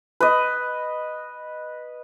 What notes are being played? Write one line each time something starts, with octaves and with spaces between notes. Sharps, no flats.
B4 D#5